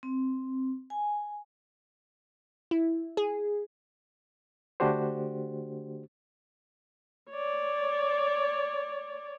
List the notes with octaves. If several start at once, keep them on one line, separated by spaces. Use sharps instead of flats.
C4
G#5
E4
G#4
D3 A3 D4 F#4 G4 C5
C#5 D5